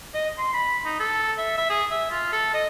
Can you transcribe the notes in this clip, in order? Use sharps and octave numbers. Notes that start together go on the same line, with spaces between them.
D#5
C6
B5
D#4
A4
E5
E5
G#4
E5
F4
A4
D#5